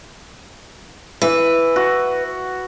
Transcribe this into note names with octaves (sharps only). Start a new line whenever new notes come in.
E3 B4
F#4